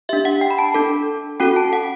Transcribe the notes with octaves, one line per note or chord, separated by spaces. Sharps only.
D4 G4 E5
F#5
G5
B5
A5
D4 A4
C#4 F#4 A4 G5
A5
F#5